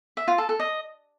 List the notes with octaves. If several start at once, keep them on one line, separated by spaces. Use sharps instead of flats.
E5
F4
A4
A4
D#5